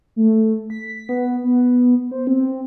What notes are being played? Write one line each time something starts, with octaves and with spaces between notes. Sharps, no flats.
A3
B6
B3
B3
C5
C4